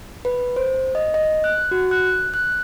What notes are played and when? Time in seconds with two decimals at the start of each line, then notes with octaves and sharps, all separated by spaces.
0.25 B4
0.56 C5
0.95 D#5
1.14 D#5
1.44 F#6
1.71 F#4
1.91 F#6
2.34 F#6